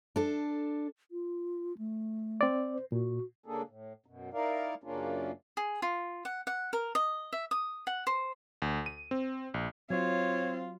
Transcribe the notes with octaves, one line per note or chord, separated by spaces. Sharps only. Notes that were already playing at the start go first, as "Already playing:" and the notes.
D4 A4
F4
A3
C4 D5
C5
A#2 F#4
C#3 A#3 D4 G#4 A4
A2
F#2 B2
D#4 E4 A#4 D5 F5
F#2 C#3 A#3 C#4 D4 F4
G#4
F4
F#5
F#5
A#4
D#5
E5
D#6
F#5
C5
D2
D#7
C4
A#1
F#3 C4 F4 C#5